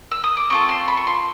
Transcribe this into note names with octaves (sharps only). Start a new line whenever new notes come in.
E6
D#6
D6
C4 F4 A4 C#6
C6
B5
C#6
C6